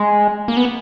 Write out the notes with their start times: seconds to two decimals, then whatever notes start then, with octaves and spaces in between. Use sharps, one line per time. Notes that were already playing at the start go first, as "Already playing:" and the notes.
Already playing: G#3
0.48 A#3
0.57 B3